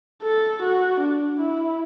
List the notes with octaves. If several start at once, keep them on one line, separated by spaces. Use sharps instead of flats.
A4
F#4
D4
E4